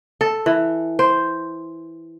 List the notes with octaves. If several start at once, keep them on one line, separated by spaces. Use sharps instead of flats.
A4
E3
C5